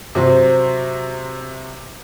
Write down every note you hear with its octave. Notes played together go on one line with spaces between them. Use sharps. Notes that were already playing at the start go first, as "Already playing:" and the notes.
C3 F#3 C4